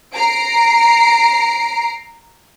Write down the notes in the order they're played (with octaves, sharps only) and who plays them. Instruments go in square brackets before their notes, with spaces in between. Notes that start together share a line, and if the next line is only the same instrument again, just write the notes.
[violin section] A#5 C7 D7